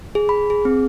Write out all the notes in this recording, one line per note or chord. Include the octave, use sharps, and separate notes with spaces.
G#4
B5
G#4
C4